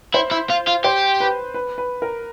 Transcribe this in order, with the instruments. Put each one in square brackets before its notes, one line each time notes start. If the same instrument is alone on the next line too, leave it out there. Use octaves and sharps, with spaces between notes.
[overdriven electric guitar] E4 [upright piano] C5
[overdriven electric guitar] E4
F4
F4
[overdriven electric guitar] G4 [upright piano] C5
[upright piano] B4
B4
B4
A#4